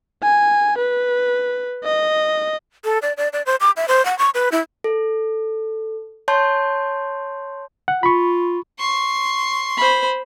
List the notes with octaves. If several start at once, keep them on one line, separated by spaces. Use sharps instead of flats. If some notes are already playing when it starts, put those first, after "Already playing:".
G#5
B4
D#5
A4
D5
D5
D5
C5
D6
E5
C5
F#5
C#6
B4
E4
A4
C#5 A5 C6 G6
F#5
F4 B5 C#6
C6 C#6
C5 B5